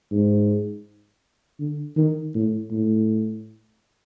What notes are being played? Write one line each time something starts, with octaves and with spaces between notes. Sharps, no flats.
G#2
D3
D#3
A2
A2